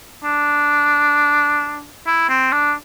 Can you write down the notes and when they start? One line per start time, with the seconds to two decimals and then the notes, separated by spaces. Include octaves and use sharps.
0.24 D4
2.06 E4
2.29 C4
2.52 D4